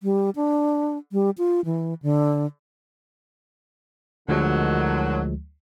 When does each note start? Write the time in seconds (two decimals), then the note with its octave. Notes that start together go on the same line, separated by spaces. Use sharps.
0.03 G3
0.36 D4
1.12 G3
1.38 F4
1.65 E3
2.02 D3
4.29 D2 D3 D#3 F3 F#3 G#3